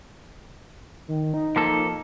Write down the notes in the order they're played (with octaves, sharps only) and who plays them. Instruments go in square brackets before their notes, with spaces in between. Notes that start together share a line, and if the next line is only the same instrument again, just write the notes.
[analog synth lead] D#3
D#4
[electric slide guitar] F3 A#3 A4